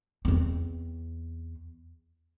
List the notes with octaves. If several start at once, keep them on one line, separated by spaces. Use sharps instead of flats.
E2 C4